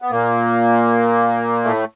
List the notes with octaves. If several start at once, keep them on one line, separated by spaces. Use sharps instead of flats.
B3
A#2 A#3
A2 A3